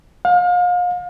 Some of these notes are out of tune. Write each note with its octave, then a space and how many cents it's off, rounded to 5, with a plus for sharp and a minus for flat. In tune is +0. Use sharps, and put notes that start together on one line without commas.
F5 +35